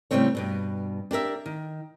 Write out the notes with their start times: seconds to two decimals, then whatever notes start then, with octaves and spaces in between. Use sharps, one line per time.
0.11 A2 C#3 G3 A3 C4 C#5
0.35 G2 B2 G3
1.11 D4 G4 A#4 E5
1.46 D#3